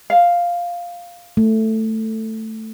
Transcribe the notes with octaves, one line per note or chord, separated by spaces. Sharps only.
F5
A3